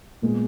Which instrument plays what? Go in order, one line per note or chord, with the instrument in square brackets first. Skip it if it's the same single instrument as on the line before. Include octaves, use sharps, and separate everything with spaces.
[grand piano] A#2 G#3 B3